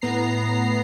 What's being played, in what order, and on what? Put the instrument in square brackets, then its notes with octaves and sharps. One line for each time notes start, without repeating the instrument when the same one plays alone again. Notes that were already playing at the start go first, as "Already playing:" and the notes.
[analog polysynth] A2 B3 A#5 C7